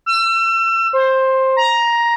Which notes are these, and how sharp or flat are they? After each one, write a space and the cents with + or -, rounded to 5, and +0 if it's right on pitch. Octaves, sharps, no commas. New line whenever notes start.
E6 +35
C5 +15
A#5 +10